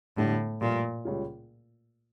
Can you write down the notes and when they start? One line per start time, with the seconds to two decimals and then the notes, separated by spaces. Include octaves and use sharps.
0.17 E1 E2 A2 D3 G3 D4
0.61 G2 A#2 F3 A3
1.05 C#2 C#3 G3 C#4 F4